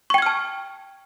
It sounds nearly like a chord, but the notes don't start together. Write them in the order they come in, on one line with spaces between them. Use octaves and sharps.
C#6 G5 G#6 F6 A5